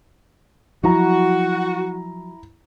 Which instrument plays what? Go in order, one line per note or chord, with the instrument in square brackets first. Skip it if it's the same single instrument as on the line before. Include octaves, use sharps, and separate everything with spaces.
[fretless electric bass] F3 F#3 [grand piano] E4 A#5 [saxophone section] F#4